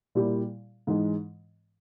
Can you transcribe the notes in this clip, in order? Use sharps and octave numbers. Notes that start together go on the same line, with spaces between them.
A#2 G3 A#3 E4 G4
G#2 E3 G#3